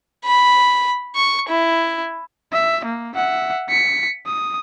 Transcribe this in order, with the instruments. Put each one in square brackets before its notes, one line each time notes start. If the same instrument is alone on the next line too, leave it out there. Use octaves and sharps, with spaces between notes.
[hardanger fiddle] B5
C#6
E4
[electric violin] E5
A#3
E5 F#5
B6 C#7
D#6